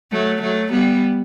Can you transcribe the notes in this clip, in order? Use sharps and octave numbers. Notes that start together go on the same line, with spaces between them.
F#3 A3
F#3 A3
G3 B3